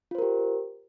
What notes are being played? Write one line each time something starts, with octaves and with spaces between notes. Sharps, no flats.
F4 G4 A#4 C5